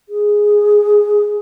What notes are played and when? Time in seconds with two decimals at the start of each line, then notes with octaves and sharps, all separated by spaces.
0.09 G#4